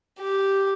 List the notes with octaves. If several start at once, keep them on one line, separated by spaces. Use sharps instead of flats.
G4